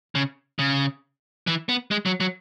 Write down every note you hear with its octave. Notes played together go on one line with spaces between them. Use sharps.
C#3
C#3
E3
B3
G#3
F#3
F#3